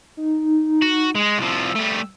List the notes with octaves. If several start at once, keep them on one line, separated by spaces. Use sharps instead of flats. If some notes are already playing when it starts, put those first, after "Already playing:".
D#4
F#4
G#3
C2 F3 E6
G3 A3